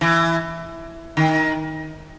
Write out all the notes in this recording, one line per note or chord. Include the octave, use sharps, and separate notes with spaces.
E3
D#3